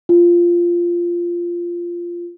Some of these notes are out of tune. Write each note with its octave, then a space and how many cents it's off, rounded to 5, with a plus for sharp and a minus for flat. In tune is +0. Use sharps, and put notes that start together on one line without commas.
F4 -10